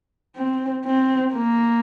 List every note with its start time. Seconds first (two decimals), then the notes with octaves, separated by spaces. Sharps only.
0.36 C4
0.85 C4
1.34 A#3